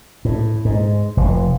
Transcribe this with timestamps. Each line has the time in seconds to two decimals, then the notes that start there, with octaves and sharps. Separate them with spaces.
0.25 A2
0.65 G#2
1.17 F1